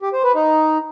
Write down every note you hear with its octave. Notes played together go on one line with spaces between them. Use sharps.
G4
C5
B4
D#4